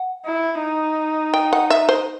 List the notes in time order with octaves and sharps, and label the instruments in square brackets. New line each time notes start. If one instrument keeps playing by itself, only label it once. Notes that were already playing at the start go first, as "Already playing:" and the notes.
Already playing: [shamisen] F#5
[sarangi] E4
D#4
[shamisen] G5
F#5
E5
C5